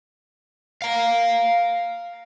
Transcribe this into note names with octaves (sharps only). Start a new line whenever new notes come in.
F5 A#5